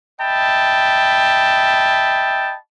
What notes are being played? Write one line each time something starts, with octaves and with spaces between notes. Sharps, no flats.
D#5 E5 G5 A5 B5